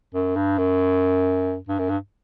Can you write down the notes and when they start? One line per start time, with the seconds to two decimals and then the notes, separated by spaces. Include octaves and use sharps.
0.14 F#2
0.36 G2
0.58 F#2
1.68 G2
1.79 F#2
1.89 G2